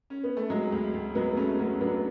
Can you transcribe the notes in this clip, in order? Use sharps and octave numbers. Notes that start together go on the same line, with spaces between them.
C#4
B3
A3
F#3 G#3
D2
D2
F#3 G#3 B3
F#3 A3 C#4
F#3 A3 C#4
F#3 B3 D4